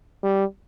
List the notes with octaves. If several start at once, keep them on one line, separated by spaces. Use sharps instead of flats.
G3